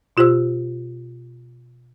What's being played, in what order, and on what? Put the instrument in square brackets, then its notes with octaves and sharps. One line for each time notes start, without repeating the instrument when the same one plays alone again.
[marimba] B2 F4 G4 C5 E6